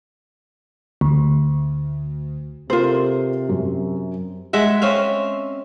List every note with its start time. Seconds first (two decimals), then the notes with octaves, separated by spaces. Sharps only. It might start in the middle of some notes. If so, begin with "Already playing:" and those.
1.01 D2
2.70 C3 F4 A4 A#4 C5
3.49 F#2
4.53 G#3 E5 F#5
4.82 C4 C#4 E5 F5